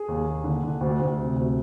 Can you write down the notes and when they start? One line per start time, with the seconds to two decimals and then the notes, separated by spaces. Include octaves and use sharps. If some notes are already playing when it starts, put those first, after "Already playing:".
Already playing: G#4
0.08 D#2
0.26 D#2
0.44 D3
0.63 D3
0.81 D2
0.99 D2
1.17 C3
1.36 D2